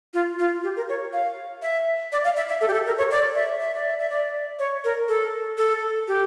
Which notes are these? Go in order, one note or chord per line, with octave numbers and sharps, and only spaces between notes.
F4
F4
G4
A#4
C#5
F5
E5
D5
F5
E5
E5
A4
G4
A4
A#4
C#5
D5
E5
E5
D5
E5
E5
D5
C#5
A#4
A4
A4
G4